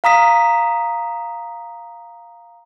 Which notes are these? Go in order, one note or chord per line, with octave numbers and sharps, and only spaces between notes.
F5 A#5 D#6 B6